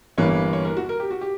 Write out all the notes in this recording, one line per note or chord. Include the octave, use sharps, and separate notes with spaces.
G1 G2 E3 A#3 C#5
C#5
A#4
F#4
A#4
G4
F#4
G4